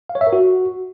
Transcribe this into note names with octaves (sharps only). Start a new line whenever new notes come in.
F5
C#5
E5
A#4
F#4